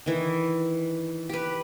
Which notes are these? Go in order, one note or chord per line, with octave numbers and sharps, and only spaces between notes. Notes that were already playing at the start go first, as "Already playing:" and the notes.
D#3 E3
G4 B4